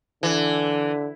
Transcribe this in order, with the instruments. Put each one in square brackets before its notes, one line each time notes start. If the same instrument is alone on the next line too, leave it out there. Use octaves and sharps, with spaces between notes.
[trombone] D3 [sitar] E3